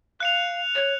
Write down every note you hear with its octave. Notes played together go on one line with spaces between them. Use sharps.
F5 F#6 C#7 F7
C#5